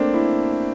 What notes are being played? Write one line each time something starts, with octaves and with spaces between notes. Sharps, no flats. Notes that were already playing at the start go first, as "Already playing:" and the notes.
Already playing: A3 A#3 C4 D4
E4